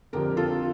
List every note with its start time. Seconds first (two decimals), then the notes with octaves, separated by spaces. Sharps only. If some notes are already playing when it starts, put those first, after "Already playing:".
0.13 F2 D3 F3 G4 A#4
0.37 F4 A4